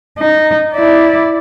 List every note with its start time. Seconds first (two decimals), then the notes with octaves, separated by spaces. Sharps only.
0.19 D#4
0.74 E4 D5